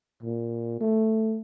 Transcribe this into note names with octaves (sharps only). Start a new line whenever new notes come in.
A#2
A3